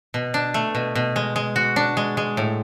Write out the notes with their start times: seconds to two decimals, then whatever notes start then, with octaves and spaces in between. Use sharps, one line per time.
0.14 B2
0.34 D4
0.54 A3
0.75 B2
0.95 B2
1.16 G#3
1.36 G#3
1.56 F#4
1.76 D4
1.97 G#3
2.17 G#3
2.37 A2